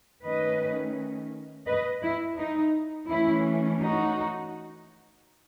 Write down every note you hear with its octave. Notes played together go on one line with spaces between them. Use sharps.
D#3 A3 C#4 B4 D#5
B4 D#5
E4
D#4
E3 A3 C#4 E4
D#4 F#4